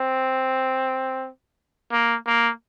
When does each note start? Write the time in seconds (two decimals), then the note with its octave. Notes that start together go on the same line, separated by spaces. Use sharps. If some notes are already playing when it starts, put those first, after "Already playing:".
Already playing: C4
1.92 A#3
2.26 A#3